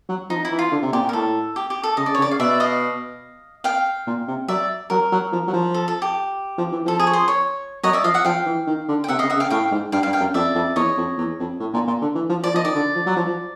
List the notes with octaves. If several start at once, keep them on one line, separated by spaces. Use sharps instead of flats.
F#3
F3 D#4
E4
E3
F4
D3
C3
A#2 G4
A#2
A#4
A2 A4
G4
G4
A4
C#3 D#5
D5
C#5
C#3
D5
F5
B2 D5 E5
D#5 F5
F5 G5
A#2
C3
F#3 D5 E5
F#3 A#4
F#3
F3
F#3
F3
A4
A4
G4
F3
E3
F3 A4
G#4
C#5
C5
C#5
F#3 C#5 D#5
D5 E5
F3 D#5 F5
E5 F#5
F3 F5 G5
E3
D#3
D3
G5
C3 E5 F#5
C#3 D#5 F5
E5 F#5
C#3
F5 G5
A2 F5 G5
G#2
G2 F5 G5
F5 G5
G2
F5 G5
F#2
F2 D5 E5
F2
E2 C#5 D#5
F2
E2
F2
A2
A#2
A#2
D3
E3
F3
F3 D5
F3 D#5
D#3 D5
D3
F3
F#3
F3
F3